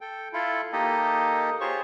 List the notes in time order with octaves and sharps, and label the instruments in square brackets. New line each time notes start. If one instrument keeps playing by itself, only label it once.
[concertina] A4 G5
E4 F4 A4
A#3 D#4 G4 A4 D#5
F4 G4 G#4 C5 C#5 C#6